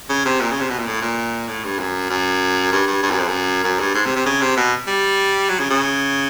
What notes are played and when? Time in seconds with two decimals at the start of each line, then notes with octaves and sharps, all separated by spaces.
0.10 C#3
0.25 C3
0.41 A#2
0.52 C#3
0.60 C3
0.70 B2
0.79 A#2
0.87 A2
1.02 A#2
1.48 A2
1.64 G2
1.79 F#2
2.10 F#2
2.72 G2
2.87 G2
3.03 G2
3.11 F#2
3.19 F2
3.28 F#2
3.64 F#2
3.80 G2
3.95 G#2
4.05 C3
4.16 C3
4.26 C#3
4.41 C3
4.57 B2
4.87 G3
5.49 F#3
5.60 C#3
5.70 C#3